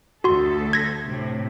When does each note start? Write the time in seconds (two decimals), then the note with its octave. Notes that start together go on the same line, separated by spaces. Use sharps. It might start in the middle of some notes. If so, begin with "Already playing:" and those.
0.24 D2 F#4 A4 C6
0.73 G#6 A#6 B6
1.04 A2 C3